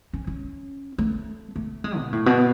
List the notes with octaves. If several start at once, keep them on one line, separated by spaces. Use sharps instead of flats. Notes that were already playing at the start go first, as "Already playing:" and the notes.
C#4
C#4
A3
A3
G#3
B2
A2
B2